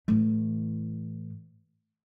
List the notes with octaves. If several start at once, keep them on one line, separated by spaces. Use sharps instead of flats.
A2 E3